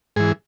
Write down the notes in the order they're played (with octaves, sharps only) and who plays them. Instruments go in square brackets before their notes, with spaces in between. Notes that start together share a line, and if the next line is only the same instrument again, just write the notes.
[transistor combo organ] G#2 E3 G#4